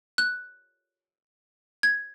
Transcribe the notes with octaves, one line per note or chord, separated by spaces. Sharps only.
F#6
G#6